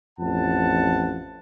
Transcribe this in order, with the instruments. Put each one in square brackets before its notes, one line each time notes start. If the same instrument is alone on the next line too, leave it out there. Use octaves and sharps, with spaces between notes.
[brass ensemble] A1 F2 F3 F#5 A5